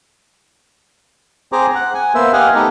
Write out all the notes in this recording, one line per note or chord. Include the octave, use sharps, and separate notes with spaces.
C4 G#4 C5 A#5 D6
F#5
G#5
A#3 B3 C5 E5
G4 D#5 F5 F#5 G#5
A3 B3 D#4 G4 A4